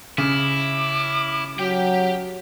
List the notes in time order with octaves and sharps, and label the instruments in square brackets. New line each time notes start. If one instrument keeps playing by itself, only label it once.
[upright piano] C#3 [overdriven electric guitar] E4 [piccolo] D6
[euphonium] F#3 [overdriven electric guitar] G4 G5